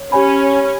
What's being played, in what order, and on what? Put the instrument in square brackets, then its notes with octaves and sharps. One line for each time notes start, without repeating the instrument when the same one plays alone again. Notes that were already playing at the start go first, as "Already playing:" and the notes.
Already playing: [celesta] C#5
[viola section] C#4 [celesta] G4 C#5 G#5 B5